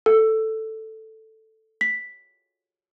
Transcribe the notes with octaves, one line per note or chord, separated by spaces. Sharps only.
A4
B6